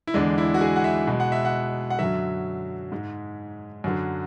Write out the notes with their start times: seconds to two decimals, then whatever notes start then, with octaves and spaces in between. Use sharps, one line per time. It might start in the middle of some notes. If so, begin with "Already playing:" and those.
0.07 E4
0.14 E2 D3 G#3 D4
0.38 E4
0.54 F#4
0.61 G#4
0.76 F#5
0.84 E5
1.07 B2 G#3
1.20 F#5
1.32 E5
1.45 F#5
1.90 F#5
1.99 F#2 D3 F#3 E5
2.92 G#2 G#3
3.84 F#2 D3 F#3